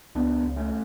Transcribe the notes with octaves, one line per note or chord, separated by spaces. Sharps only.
C#2 B3 D4
C#2
A3 C#4